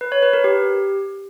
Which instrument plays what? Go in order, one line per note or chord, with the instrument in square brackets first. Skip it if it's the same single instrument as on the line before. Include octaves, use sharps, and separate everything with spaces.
[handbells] B4
C#5
B4
A#4
G4